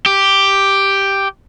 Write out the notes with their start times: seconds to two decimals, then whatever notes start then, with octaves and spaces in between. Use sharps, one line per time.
0.06 G4